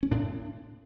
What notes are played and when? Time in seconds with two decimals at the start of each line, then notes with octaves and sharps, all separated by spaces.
0.03 C#4
0.11 A2 D4